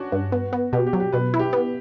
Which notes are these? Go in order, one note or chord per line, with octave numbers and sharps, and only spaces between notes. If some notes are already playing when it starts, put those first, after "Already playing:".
Already playing: C#4 D4 F#4
G2
B3
B3
B2 G4
G4
F#3
G4
B2 B4
E4
G4
B3